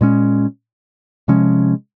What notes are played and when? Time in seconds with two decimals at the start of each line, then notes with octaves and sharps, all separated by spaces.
0.01 A#2 G#3 C#4
1.28 C3 F3 G#3 C#4